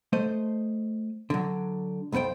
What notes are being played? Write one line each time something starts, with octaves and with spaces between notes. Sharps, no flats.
A3 C5 D#5
D3 F#3
B1 F2 B3 C5 G5